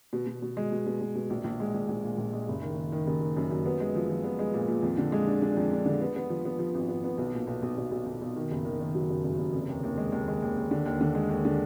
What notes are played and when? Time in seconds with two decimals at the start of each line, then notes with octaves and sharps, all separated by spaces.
0.13 B2
0.27 B2
0.42 B2
0.57 G#3
0.72 B2
0.87 B2
1.01 B2
1.15 B2
1.30 A#1
1.44 A#1
1.60 G#3
1.74 A#1
1.88 A#1
2.04 A#2
2.18 A#1
2.33 G#3
2.48 F#1
2.62 D#3
2.77 D#3
2.92 D#3
3.07 F#1
3.21 D#3
3.37 F#2
3.51 F#2
3.66 B3
3.80 G#3
3.96 F3
4.10 F3
4.24 B3
4.39 G#3
4.54 A#2
4.68 A#2
4.83 F2
4.98 D3
5.12 G#3
5.27 D4
5.42 D4
5.57 F2
5.72 D4
5.86 D3
6.01 B3
6.16 B3
6.30 F3
6.45 B3
6.59 F3
6.75 G#1
6.89 B3
7.04 B3
7.18 B1
7.33 A#2
7.47 B1
7.62 B1
7.77 B1
7.91 B1
8.06 B1
8.21 B1
8.36 D#3
8.51 F#1
8.65 D#3
8.81 D#3
8.95 F#3
9.10 F#1
9.24 F#1
9.39 F#1
9.53 F1
9.69 D#2
9.84 D#2
9.98 G#3
10.12 D#2
10.28 G#3
10.42 D#2
10.57 D#2
10.71 D3
10.86 D#2
11.01 D3
11.15 G#3
11.30 D#2
11.45 D3